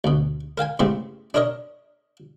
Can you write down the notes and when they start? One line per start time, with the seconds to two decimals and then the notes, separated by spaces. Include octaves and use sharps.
0.04 D2 B2
0.58 A#4 F5 G5 G#5
0.79 A2 C#3 G#3 B3 C4 G4
1.34 D4 D#4 A#4 C#5 D#5